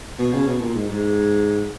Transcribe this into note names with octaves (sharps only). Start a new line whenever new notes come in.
B2
C#3
B2
A#2
G#2
G#2